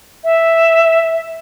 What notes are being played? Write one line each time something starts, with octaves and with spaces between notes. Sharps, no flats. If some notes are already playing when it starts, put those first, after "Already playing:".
E5